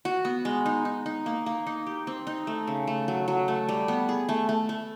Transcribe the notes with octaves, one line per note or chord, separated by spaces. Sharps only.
F#4
B3
G#3
D#4
D#4
D#4
A#3
A#3
D#4
G4
C4
D#4
A3
C#3
A3
F#3
F#3
A3
G3
B3
G#4
A3
A3
A3